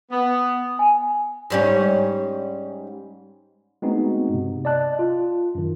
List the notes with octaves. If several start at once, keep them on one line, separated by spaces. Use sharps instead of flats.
B3
G#5
G#2 G3 C#4
G#3 A3 B3 C4 D#4 F#4
G2 C3
D5 D#5 A5 F#6
F4
F#2 D#3